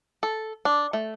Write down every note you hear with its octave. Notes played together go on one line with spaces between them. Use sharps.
A4
D4
A3